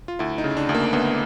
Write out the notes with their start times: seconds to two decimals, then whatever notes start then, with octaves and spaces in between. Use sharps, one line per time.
0.08 F4
0.19 D2 E4
0.38 D#4
0.44 C#3
0.57 D4
0.69 D2
0.74 A#3
0.93 D2 B3